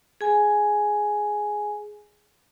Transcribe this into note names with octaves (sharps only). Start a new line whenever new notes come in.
G#4 G#5